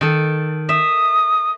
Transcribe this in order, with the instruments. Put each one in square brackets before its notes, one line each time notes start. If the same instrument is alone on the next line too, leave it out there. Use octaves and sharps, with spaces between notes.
[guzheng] D#3 A4
[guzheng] E5 [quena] D#6